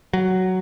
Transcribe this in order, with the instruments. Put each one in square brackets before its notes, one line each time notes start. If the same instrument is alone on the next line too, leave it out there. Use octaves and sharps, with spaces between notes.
[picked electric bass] F#3